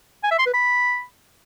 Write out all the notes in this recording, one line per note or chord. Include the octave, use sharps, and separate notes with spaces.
G#5
E5
C6
B4
B5